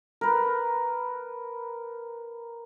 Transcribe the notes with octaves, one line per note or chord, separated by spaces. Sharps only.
A#4 B4